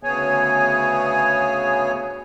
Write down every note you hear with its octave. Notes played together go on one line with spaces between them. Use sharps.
D2 C#3 B3 G#4 C#5 G#5